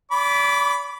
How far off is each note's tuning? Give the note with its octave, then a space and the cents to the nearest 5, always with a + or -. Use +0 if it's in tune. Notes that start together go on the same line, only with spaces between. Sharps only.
D5 -45 B5 +0 D6 -10